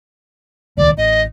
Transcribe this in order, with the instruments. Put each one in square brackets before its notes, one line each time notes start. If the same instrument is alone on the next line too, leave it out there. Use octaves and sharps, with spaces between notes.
[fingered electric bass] D#1 C#2 D#3 [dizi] D5
[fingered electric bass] A1 [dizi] D#5